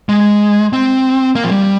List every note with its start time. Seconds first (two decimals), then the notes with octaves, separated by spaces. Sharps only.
0.09 G#3
0.73 C4
1.35 A#3
1.45 F3
1.51 G3